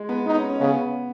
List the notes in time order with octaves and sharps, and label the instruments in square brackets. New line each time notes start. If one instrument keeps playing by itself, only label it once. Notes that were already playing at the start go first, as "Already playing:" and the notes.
Already playing: [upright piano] G#3
B3
[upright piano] B3 [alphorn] D#4
[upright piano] C#4
C#4
[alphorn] C#3 [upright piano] B3